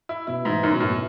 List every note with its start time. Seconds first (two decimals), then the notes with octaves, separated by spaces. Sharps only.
0.09 E4
0.27 B2 E4
0.45 G#2 E3
0.63 F#2 D#3
0.72 B2
0.80 F#2 A2
0.89 B2